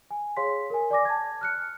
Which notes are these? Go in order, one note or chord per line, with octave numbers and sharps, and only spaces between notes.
G#5
G#4 C#5 F5 C6 B6
A#4 G#5
D5 G#5 D6 A#6
A5 G#6
F6 F#6 C#7